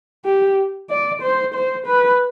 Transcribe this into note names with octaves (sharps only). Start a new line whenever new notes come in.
G4
D5
C5
C5
B4